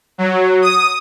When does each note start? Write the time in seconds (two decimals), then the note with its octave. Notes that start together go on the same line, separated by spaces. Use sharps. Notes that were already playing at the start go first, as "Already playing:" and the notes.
0.18 F#3
0.62 D#6